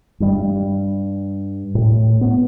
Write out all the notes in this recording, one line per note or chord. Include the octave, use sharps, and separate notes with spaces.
G2 G3
A2
B3